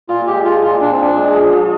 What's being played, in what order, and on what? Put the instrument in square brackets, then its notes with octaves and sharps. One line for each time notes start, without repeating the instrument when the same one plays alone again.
[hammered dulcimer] A#2 [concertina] F4
[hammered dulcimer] G#3 [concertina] G4
[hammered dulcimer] F3 [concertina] F4
[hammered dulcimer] A#2 [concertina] F4
[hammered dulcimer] A#2 [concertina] D4
[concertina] C4
[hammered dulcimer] F3 [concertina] D4
[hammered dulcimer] G#3
F3
F3